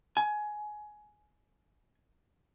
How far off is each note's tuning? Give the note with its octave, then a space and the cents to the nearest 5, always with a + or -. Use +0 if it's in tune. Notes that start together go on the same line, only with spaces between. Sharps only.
G#5 +20